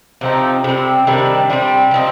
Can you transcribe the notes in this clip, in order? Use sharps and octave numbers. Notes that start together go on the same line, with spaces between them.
C3 F3 C4 D#4
C3 G3 C4
C3 D#3 G3 D4
C3 G3 C4
F3 C4 D#4